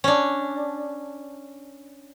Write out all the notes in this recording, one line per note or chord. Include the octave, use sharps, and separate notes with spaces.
C#4 D4